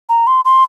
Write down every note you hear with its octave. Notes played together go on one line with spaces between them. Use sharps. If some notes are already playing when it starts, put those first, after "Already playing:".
A#5
C6
C6